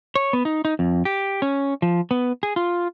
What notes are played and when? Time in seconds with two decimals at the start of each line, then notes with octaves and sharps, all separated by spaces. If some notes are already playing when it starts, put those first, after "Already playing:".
0.15 C#5
0.33 B3
0.45 D#4
0.65 D#4
0.79 F2
1.05 G4
1.42 C#4
1.82 F3
2.11 B3
2.43 G#4
2.56 F4